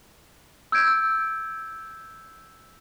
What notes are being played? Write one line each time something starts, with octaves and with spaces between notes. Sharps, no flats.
E6 G6 G#6 D7